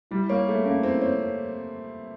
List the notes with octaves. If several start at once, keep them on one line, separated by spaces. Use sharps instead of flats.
G3 E4
A#3 C#5
A3 G#4
A#3 C#4
C4 E4
C4 C#5